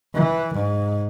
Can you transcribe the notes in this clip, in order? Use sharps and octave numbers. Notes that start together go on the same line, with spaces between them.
E3
G#2